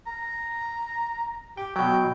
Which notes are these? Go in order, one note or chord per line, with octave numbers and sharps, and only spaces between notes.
A#5
G4 G5
B2 F#3 G5